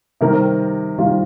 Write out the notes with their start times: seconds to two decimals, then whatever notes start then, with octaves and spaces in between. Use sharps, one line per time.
0.21 C3 D#3 G3 A#4
0.98 C3 D#3 G3 F4